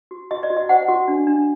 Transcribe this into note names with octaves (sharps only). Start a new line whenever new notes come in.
F#4
F#4 D#5
D5
F#4
D#5
C5 F#5
F#4
D4
D4